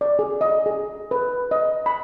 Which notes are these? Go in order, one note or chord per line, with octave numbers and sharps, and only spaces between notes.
D5
G#4
D#5
G#4
B4
D#5
B5